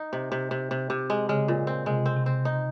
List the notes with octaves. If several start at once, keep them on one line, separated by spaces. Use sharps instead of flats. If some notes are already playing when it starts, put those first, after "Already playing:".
Already playing: D#4
C3
C3
C3
C3
C3
G#3
C#3 G#3
A#2
C4
C3 G#3
C4
C3
C4
D#4